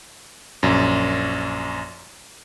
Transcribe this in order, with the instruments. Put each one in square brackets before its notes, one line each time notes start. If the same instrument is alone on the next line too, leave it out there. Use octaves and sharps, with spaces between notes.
[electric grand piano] A#1 F#2